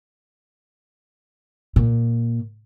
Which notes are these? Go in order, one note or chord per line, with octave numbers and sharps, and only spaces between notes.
A#2